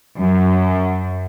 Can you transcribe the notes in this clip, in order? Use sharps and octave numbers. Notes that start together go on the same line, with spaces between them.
F#2